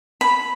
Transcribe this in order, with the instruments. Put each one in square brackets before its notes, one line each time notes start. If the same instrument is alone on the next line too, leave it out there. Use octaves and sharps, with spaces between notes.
[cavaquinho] B5